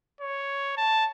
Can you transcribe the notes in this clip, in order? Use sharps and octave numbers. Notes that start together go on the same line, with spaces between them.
C#5
A5